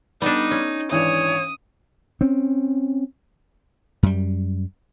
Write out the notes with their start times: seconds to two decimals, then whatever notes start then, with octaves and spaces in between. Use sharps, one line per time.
0.22 G3 B3 D4 D#4
0.51 C#4
0.91 G#1 E3 D4 C#5 D#6
2.21 C4 C#4
4.03 F#2 G3